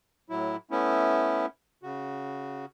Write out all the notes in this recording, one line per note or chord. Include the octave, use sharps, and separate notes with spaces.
A2 F#3 E4
A3 B3 C#4 E4
C#3 F#4